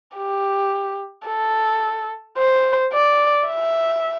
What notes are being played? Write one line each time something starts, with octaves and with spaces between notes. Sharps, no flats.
G4
A4
C5
D5
E5